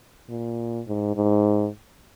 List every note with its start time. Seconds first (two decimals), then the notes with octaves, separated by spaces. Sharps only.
0.29 A#2
0.87 G#2
1.16 G#2